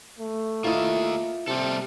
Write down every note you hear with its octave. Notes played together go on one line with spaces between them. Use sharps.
A3
A#3 E4 F4 D#5
C3 G3 A4